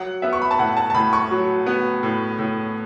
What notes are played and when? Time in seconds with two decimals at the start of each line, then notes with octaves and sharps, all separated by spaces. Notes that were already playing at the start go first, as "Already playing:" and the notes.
Already playing: F#3 F#5
0.22 B3 E5
0.33 C#6
0.42 B5
0.51 A5
0.59 A2 F#5
0.77 A5
0.90 A5
0.95 A2 B5
1.13 C#6
1.31 F#3
1.67 B3
2.03 A2
2.39 A2